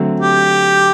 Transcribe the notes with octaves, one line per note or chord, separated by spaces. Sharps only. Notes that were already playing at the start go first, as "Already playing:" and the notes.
Already playing: D3 F#3 A3 C4
G4